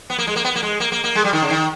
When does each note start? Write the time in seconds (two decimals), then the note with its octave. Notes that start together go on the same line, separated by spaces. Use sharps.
0.10 B3
0.18 A#3
0.27 G#3
0.36 A#3
0.44 B3
0.56 A#3
0.63 G#3
0.80 A#3
0.92 A#3
1.04 A#3
1.15 G#3
1.24 G3
1.33 D#3
1.42 C#3
1.50 D#3